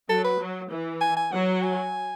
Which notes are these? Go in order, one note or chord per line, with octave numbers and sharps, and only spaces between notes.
F#3 A4
B4
F#3
E3
G#5
G#5
F#3 F#5
G#5